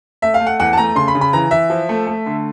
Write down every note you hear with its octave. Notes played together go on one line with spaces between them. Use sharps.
A3 E5
F5
A3
F#5
E2 F#5
A5
A3 A#5
C#3 C6
B5
C#3
B5
E3 A#5
E3 E5
F3
A3
A3
D3